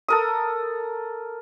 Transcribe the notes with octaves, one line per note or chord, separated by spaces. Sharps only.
A4 A#4 D#6